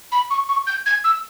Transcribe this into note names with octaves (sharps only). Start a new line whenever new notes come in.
B5
C#6
C#6
G6
G#6
E6